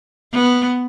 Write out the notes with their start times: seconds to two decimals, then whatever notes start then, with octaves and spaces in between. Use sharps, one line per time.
0.33 B3